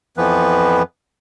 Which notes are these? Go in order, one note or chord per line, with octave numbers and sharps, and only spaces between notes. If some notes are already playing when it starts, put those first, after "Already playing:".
F2 E3 F3 B3 B4